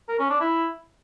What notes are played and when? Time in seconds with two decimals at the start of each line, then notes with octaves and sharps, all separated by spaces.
0.09 A#4
0.19 C#4
0.30 D4
0.40 E4